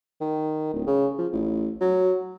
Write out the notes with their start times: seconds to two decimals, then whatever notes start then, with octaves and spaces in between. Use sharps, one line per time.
0.21 D#3
0.74 D1
0.87 C#3
1.19 F3
1.33 A1
1.81 F#3